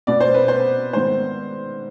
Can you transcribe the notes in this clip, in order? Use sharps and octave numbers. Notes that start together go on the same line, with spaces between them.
B2 B3 D5
C5
B4
C5
G#2 D#3 B3 C5